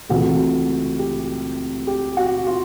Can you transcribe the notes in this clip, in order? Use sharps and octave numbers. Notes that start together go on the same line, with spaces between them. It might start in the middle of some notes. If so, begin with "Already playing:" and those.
C#2 C3 E3 A3 C4 F#4
G4
G4
F#4
F4